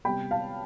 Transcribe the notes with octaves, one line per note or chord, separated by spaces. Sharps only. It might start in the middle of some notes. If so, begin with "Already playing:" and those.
C3 G3 B3 G5 B5
F5 A5